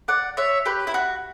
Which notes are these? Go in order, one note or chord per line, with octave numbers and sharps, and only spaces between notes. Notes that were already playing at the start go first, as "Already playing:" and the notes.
D5 F#5
C#5 E5
G4 B4
E4
F#4